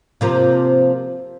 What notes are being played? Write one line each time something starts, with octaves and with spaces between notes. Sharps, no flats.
C3 F3 A#3